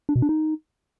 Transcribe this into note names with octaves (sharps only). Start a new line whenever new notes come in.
D4
B2
D4
D#4